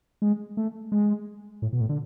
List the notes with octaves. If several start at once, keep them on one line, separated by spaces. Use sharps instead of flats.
G#3
A3
G#3
A2
B2
A2
D3